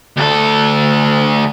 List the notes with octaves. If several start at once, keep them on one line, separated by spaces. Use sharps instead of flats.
D2 A4